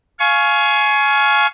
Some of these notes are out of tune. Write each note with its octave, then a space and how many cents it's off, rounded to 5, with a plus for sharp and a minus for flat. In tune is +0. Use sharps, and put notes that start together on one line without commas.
F5 +0 G#5 +25 C#6 +0